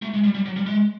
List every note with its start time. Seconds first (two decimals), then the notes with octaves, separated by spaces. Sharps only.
0.02 A3
0.14 G#3
0.24 G3
0.35 G3
0.46 F#3
0.56 G3
0.66 G#3